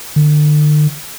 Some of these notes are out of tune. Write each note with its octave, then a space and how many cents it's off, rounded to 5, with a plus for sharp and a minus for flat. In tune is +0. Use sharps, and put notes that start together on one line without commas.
D3 +35